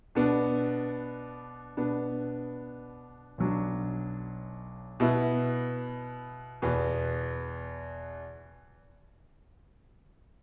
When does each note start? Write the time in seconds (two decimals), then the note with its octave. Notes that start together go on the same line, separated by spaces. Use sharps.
0.15 B2 B3 D4
1.77 B2 B3 D4
3.38 B1 B2 F#3 D4
5.00 B2 B3 E4
6.62 E2 B2 B3